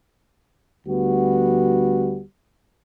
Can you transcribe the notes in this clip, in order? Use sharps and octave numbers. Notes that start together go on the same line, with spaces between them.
D2 G3 B3 F#4